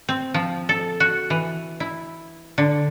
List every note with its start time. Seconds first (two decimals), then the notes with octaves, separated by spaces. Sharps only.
0.09 C4
0.34 F3
0.69 A4
1.00 F#4
1.30 E3
1.80 E4
2.58 D3